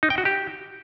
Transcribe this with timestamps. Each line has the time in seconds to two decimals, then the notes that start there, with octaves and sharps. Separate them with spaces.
0.03 D#4
0.10 G5
0.18 F#4
0.25 G4